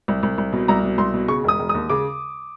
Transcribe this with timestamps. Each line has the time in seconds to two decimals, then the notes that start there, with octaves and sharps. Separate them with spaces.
0.08 C2
0.23 C2
0.38 C2
0.53 B2
0.68 C2 A#5
0.84 B2
0.98 C2 C6
1.14 B2
1.28 C#3 C#6
1.44 E1 D#6
1.59 E1
1.69 D#6
1.75 D#2
1.90 C#3 D6